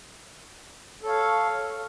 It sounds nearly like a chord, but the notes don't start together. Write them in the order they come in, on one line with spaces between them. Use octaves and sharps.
A4 C#5 F5